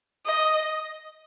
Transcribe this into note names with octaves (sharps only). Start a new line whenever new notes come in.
D#5